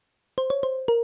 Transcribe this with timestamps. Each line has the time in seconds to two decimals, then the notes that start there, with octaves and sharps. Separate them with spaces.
0.38 C5
0.50 C#5
0.63 C5
0.88 A#4